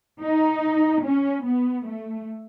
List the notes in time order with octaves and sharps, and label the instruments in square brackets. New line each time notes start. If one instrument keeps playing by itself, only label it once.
[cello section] D#4
C#4
B3
A3